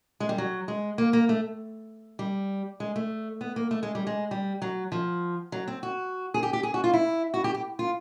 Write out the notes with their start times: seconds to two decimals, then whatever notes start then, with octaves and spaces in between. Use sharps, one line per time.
0.20 G#3
0.29 G3
0.38 F#3
0.68 G#3
0.98 A#3
1.13 A#3
1.29 A3
2.19 G3
2.80 G#3
2.96 A3
3.41 B3
3.56 A#3
3.71 A3
3.83 G#3
3.95 G3
4.07 G#3
4.31 G3
4.62 F#3
4.92 F3
5.52 F#3
5.68 C4
5.83 F#4
6.34 G#4
6.43 G4
6.53 G4
6.63 G#4
6.74 F#4
6.84 F4
6.93 E4
7.34 F#4
7.44 G4
7.54 G4
7.79 F4